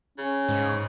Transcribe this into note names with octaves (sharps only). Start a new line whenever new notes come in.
C#3 C#4
G#2